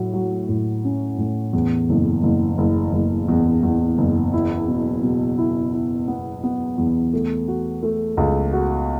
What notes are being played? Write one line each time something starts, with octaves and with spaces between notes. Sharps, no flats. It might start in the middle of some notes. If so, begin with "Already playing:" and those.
Already playing: A2 F#3
F#3
A2
C#4
A2
E2
F#1
F#1
F#1
F#1
E2
E2
F#1
E4
B2
B2
E4
E4
B3
B3
E2
A3
F#4
A3
C#2
F#4